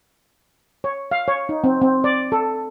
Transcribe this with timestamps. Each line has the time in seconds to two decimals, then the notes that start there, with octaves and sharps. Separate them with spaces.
0.84 C#5
1.11 F5
1.28 C#5
1.49 D#4
1.64 C4
1.81 C4
2.04 D5
2.32 A4